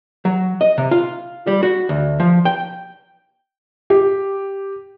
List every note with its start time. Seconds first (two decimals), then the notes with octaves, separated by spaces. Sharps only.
0.25 F#3
0.61 D#5
0.78 C3
0.91 F4
1.47 G3
1.63 F#4
1.89 D2
2.20 F3
2.45 G5
3.90 G4